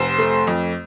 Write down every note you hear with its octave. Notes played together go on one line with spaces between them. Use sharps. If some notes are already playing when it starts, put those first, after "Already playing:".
Already playing: F1 C5 C6
A3
F2